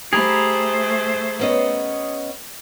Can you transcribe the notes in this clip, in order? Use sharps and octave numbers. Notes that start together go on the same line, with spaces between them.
A3 G4 G#4 C5 A#5 B5
B3 C#4 D#5